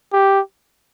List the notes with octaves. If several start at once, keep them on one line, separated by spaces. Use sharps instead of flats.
G4